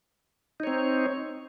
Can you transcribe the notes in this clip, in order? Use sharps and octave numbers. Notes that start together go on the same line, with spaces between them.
C4 D#4 C#5